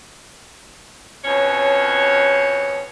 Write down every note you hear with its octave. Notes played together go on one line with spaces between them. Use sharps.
F2 B2 C#4 C#5